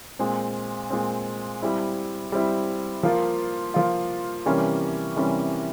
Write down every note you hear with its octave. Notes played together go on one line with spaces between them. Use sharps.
A#2 G#3 C4
A#2 G#3 C4
G3 C4 E4
G3 C4 E4
F3 A#3 F4
F3 A#3 F4
C3 E3 G3 A#3 C#4
C3 E3 G3 A#3 C#4